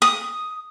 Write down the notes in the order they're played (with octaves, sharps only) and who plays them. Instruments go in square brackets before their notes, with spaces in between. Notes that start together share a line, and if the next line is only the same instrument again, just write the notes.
[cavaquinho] D#6